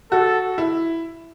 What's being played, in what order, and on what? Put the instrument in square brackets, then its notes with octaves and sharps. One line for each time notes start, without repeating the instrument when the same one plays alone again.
[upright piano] F#4 [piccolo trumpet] A4
[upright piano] E4